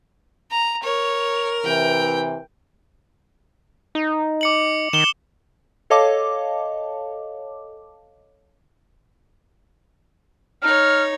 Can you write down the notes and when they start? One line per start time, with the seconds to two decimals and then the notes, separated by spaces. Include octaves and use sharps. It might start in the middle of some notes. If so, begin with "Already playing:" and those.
0.51 A#5
0.83 A#4 C#5
1.65 C3 E3 G5
3.95 D#4
4.41 D6 C#7 F#7
4.93 D#3 E7 G7
5.90 A4 C#5 D#5 F5 A5 D6
10.62 D#4 C#5 F6